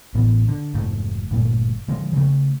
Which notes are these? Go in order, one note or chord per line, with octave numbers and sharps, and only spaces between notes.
A1 A2 B3
D3
F1 G#2 A3
G1 A#2 A3
D3 F3 G#3
C#3 A3